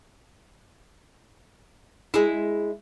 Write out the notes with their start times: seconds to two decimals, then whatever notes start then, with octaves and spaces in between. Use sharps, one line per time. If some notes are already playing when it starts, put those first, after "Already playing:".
2.14 G#3 E4